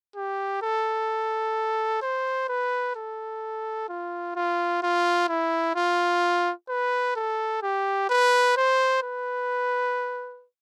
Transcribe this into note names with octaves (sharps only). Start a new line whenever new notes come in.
G4
A4
C5
B4
A4
F4
F4
F4
E4
F4
B4
A4
G4
B4
C5
B4